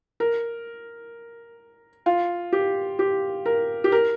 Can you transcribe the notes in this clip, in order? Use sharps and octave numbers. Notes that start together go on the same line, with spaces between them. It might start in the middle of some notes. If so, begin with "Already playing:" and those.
A#4
F4
G4
G4
A#4
G4
A#4